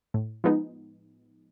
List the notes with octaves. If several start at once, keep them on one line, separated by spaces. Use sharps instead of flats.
A2
F3 G#3 B3 D#4